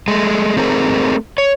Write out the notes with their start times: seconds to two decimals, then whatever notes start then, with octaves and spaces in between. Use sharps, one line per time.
0.08 G#3 A3
0.57 A3 C4 G#4 A#4
1.38 C#5